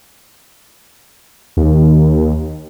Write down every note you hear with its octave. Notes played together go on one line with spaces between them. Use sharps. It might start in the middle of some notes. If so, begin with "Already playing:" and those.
D#2